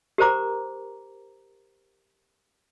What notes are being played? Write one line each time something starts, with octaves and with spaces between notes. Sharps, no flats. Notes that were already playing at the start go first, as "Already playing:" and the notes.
G4 A#4 C5 A#5 D6